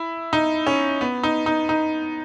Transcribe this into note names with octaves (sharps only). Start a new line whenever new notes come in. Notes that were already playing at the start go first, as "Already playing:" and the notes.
Already playing: E4
D#4
C#4
B3
D#4
D#4
D#4